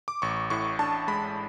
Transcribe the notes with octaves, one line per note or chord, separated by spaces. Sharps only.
D6
A1 C#6
A2 C#6
D4 A5
G#3 B5